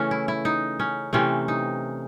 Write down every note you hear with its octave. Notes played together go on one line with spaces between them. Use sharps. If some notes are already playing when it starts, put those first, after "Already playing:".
Already playing: C#3 E3 A3 C#4
E4
E4
D#4
C#4
C3 E3 A3 C4 C#4
D#4